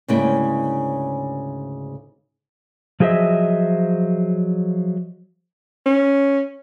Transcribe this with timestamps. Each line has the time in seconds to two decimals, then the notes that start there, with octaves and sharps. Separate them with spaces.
0.08 D2 G#2 C#3 A#3 E4 G5
3.00 F3 F#3 G#4 C5 D#5 E5
5.86 C#4